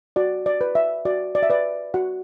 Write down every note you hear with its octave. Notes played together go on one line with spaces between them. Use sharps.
F#4 D5
D5
B4
E5
F#4 D5
D5
E5
B4 D5
F#4 F#5